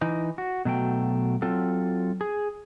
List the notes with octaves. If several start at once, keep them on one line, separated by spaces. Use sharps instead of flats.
E3 D#4
F#4
B2 F#3 A3 G5
F#3 C4 F4 A4
G#4